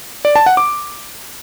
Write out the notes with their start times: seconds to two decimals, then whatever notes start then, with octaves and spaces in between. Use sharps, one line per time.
0.25 D5
0.36 A5
0.46 F#5
0.57 D6